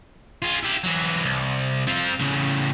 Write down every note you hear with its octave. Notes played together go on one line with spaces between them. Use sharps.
F4 G#4
E4 G4
E3 F#3
C2
C4 F4
A2 C#3